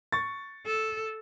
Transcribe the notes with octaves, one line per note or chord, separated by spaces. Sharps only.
C#6 A6
A4